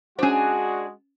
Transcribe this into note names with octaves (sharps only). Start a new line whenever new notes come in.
G#3 C#4 D4 F#4 G#4 C5